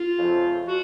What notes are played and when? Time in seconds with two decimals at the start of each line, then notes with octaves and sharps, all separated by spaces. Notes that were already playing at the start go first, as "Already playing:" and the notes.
Already playing: F4
0.17 F2 C#3 F3 A3
0.68 F#4